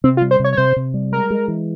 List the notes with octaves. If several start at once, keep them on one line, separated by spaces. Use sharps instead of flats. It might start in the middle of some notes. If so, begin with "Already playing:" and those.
C3 C4
F4
G3
C5
C3 C#5
C#5
C3 C5
C3
G3
G#3 A#4
G#3
E3